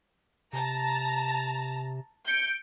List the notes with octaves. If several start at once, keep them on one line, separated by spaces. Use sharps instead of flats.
C3 A5 A#5
G6 C#7 D7